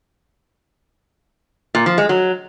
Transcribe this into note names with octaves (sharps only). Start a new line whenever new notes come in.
A#2
F3
G#3
F#3